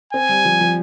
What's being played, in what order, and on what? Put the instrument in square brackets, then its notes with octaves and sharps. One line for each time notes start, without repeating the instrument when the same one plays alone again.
[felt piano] C4 [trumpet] G#5
[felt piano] G3
F3
F3